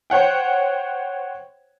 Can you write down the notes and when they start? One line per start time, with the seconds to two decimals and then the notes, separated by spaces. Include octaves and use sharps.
0.10 C5 C#5 F#5 G5